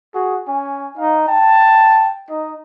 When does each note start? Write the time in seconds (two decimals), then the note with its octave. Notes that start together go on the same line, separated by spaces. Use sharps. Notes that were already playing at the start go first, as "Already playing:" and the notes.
0.14 F#4 G#4
0.48 C#4 G#5
0.97 D#4 F5
1.28 G5 A5
2.30 D#4 D#5